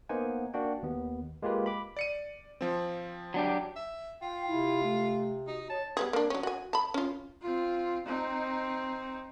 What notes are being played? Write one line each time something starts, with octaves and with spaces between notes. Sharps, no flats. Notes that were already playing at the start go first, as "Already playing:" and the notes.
A#3 B3 D#4 C5 F#5 G#5
A#3 D4 F#4 G5
D#2 B3
G#3 A#3 F4 G4 B4
B5 D6
D5 C#7 D#7
F3 C4
F#3 D4 G4
E5
F4 G5
C3 E4
A3
D#4 F#4
C#5 A5
G3 B3 G#4
A#3 D4
F#3 C#4
F#4 G#5
A5 B5
C#4 F4
C4 F4
C4 D#4